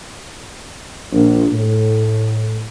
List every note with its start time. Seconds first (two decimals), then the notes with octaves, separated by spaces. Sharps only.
1.12 A#1
1.53 A2